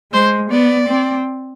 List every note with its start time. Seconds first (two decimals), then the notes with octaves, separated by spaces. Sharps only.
0.12 G#3 C5
0.50 B3 D5
0.89 C4